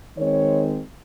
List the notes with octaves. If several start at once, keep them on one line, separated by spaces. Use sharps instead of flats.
D#3 G#3 C4 C#5